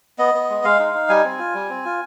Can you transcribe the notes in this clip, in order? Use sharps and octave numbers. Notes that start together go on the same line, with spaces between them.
B3 D#5
B3
G#3
G#3 F5
D#4
D#4
G3 G#5
C4
F4
G3
C4
F4